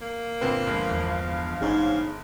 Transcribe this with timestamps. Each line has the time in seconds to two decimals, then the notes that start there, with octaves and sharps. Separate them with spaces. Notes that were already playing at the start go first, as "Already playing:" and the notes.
0.01 A#3
0.41 G1 A#2 C4 B4
0.67 G1 F3 G#3 F5
0.91 E2
1.61 A1 G#2 C#4 D#4